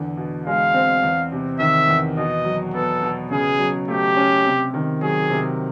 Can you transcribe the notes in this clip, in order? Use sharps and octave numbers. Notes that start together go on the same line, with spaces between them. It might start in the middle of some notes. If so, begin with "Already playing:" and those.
Already playing: E2 D3
B2
G#3 F5
C4
E2
C3
D#3 E5
E2
B2 D#5
F#3
B3 A4
B2
C#3 G#4
F#3
A3 G4
C#4
C3
D#3
F#3 G#4
C3